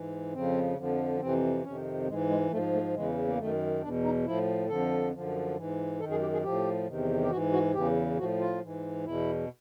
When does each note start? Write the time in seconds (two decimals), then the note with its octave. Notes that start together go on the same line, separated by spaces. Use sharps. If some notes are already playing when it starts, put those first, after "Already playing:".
Already playing: G#2 E3
0.33 F2 C#3 F3 C4
0.77 F2 D3 F3
1.21 F2 C3 E3 C4
1.64 F2 C3 D#3 C#4
2.07 G#2 E3 G#3
2.30 G#3
2.51 G#2 F3 A3
2.73 A3
2.94 E2 C#3 E3 G#3
3.27 A#3
3.38 F#2 D#3 A3
3.82 E2 D4
3.86 B2
4.04 D#4
4.26 A2 F3 E4
4.69 F2 D3 F3 A4
5.13 F#2 D3 F3
5.57 G#2 E3
6.00 F#2 D#3 A4
6.11 G#4
6.21 G4
6.33 G#4
6.44 A2 F3 G4
6.88 E2 C3 D#3
7.22 G4
7.31 G#2 E3 F#4
7.52 F#4
7.74 E2 C#3 E3 G4
8.18 A2 F3 F#4
8.40 F4
8.62 G#2 E3
9.05 E2 B2 E4